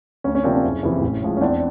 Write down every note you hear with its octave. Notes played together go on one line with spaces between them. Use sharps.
D2 C#4
C#4
C3 F3 A#3 C4 D4
C#4
F#1
F2 C3 E3
A1
A2 F3 G#3
C#4
E2 C4 D4